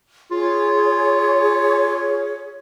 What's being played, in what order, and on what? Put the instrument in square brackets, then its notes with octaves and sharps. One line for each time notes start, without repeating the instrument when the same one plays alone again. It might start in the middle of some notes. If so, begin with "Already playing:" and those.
[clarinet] F4 [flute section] G#4 C#5